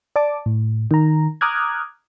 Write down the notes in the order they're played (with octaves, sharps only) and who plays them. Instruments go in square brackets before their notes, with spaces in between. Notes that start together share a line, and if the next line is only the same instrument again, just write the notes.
[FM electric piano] D5 A5 D6
A2
D#3 A#5
A#5 D6 D#6 F6 F#6 G#6